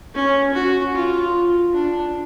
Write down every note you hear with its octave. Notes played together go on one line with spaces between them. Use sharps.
C#4
F#4
F4
D4